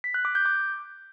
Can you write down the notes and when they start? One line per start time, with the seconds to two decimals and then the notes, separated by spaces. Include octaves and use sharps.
0.04 B6
0.14 F#6
0.25 D6
0.35 G6
0.45 D6